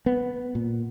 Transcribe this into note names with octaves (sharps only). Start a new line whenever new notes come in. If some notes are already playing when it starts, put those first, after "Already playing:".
B3
A#2